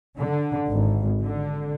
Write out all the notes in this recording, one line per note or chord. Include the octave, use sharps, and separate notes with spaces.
D3
G#1
D3